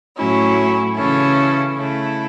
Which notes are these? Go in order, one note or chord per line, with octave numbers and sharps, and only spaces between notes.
A2 F#3 C#4 E4
C#3 E3 C#4 E4 A4
C#3 A3 E4